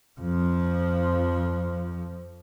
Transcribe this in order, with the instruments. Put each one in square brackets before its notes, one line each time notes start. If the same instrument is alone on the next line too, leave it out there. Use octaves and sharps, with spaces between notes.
[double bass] F2 F3